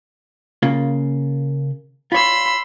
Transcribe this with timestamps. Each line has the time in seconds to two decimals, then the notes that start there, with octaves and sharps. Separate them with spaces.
0.63 C#3 A#3 F4
2.12 F4 C#5 B5 C6 E6